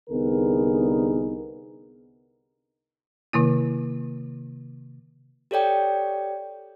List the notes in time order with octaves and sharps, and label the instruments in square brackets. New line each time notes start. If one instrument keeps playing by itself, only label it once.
[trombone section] C2 D3 B3 D#4 G#4 A#4
[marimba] C3 D#3 A#3 E4
[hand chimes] G4 A4 C#5 D5 G5